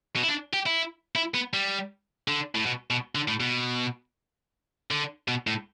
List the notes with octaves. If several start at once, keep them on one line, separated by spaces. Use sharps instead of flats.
B2
E4
D4
G4
E4
E4
B3
G3
D3
A2
B2
B2
D3
A2
B2
D3
B2
A2